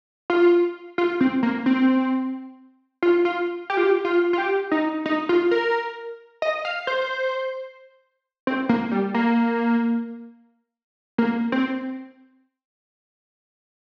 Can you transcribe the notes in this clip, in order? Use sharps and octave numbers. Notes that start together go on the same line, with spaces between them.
F4
F4
C4
A#3
C4
F4
F4
G4
F4
G4
F4
F4
G4
D#4
D#4
F4
A#4
D#5
F5
C5
C4
A#3
G3
A#3
A#3
C4